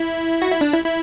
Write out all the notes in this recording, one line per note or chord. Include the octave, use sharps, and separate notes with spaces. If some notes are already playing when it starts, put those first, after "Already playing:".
Already playing: E4
F#4
E4
D4
E4
E4